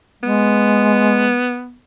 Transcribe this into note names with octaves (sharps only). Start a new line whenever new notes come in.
G#3 B3